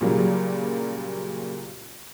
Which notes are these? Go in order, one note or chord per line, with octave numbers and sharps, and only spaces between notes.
A#2 C#3 F#3 G3 A#3